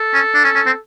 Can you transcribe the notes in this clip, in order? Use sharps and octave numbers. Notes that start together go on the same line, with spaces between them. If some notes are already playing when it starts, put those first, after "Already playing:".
Already playing: A4
C#4
D4
C#4
C#4
C4